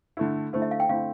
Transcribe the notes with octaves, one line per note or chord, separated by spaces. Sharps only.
D3 A3 E4
D3 A3 E4 C5
E5
F5
G5
D3 A3 C4 E4 F5